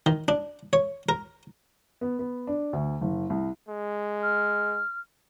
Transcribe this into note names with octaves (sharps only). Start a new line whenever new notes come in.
D#3
D4
C#5
A#4
B3
B3
D4
D2
F#1
C2
G#3
F6